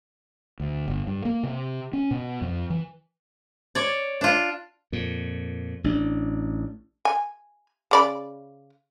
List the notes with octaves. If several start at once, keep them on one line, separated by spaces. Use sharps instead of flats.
D2
G1
G2
A#3
C3
C#4
B2
F2
E3
C#5 D5
D4 F4
F2 A#2
A1 D4
G#5
C#3 D5 B5